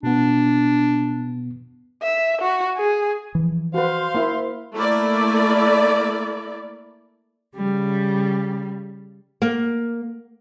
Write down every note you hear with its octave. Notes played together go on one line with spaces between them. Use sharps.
B2 B3 D4
E5
F#4
G#4
E3 F3
F#4 B4 C5 F5 C6
A#3 E4
A3 A#3 E4 D5
C#3 G3
A#3